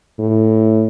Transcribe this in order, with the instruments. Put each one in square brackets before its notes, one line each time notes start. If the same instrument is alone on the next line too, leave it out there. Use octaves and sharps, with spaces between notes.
[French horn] A2